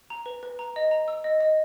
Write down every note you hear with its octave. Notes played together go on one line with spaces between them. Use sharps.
A#5
B4
B4
A#5
D#5
A#5
E6
D#5
D#5